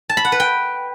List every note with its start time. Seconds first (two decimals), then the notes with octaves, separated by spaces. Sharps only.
0.09 A5
0.17 B5
0.25 F#5
0.32 B4
0.40 G5